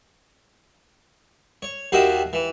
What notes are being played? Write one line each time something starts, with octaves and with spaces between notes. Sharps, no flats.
C#5
D#2 F#4 G4 C5 D#5 E5
E3